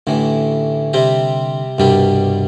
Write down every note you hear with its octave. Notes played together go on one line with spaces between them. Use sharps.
A1 A2 D3 E3
C3 G3 C4 G4
C2 G2 B2 G3 D4 G4